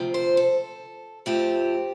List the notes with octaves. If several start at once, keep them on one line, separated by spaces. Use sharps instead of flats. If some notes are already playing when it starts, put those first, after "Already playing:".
Already playing: D2 C3 F3 C4
C5
A4
F2 F3 A3 C4 G4